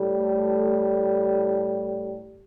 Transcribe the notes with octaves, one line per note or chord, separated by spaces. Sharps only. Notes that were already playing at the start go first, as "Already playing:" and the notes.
Already playing: A2 G3
A3